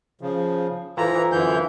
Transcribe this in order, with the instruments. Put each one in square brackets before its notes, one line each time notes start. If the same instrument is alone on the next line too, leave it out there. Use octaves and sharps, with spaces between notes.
[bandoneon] C#3 F3
[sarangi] E3 [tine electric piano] F4 A4 C5 [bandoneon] A#5
[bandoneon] F#2 D3 G6 [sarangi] E3